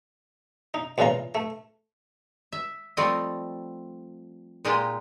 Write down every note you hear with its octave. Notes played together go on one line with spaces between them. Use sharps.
D#4
C#2 A#2 C#3 E3 F4 A#5
A3
E5
F3 G3 A3 C4 A4 D#5
A#2 G#3 D#4 F4 G4 D#5